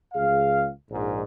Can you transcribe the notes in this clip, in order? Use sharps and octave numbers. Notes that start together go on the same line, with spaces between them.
C#2 G#4 F5
A#1 G#2